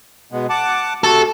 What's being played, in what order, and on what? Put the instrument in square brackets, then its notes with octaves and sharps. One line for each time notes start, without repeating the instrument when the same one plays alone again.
[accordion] B2 G#3 B3
F#5 A5 D6
[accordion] C3 A3 F#4 [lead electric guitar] A4